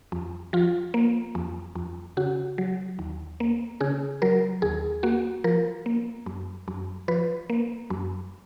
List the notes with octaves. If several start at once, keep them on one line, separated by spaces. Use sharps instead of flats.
F2
F3 F4
A#3
F2
F2
C#3 F#4
F#3
D#2
A#3
C#3 G#4
F#3 A#4
D#2 G#4
A#3 F#4
F3 A#4
A#3
F#2
F#2
F3 B4
A#3
F#2